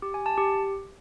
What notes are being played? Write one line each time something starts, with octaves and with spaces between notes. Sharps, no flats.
G4
G#5
A5
G4